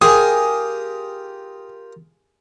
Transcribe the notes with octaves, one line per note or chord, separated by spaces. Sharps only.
F4 G4 G#4 A#4 D#6